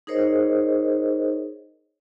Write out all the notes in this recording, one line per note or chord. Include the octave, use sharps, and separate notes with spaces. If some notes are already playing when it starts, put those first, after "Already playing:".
D#4 G#4 A#4 C5 C#5 D#5